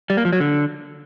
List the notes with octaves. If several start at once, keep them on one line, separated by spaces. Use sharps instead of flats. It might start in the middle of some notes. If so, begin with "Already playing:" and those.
G3
A#3
F3
F#3
D3